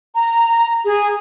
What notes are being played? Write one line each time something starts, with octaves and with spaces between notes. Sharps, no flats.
A#5
G#4